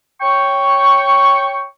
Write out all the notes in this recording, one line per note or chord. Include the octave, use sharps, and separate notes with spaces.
C#5 G5 C#6